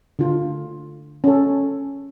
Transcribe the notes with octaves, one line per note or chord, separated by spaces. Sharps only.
D3 F4
C#4 A4